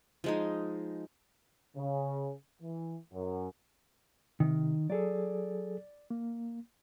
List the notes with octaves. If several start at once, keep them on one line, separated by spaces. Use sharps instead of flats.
F3 G#3 D#4
C#3
E3
F#2
C3 D#3
F#3 G#4 A4 D5
A#3